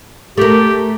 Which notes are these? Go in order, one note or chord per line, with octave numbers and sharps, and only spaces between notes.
A3 G4 A#4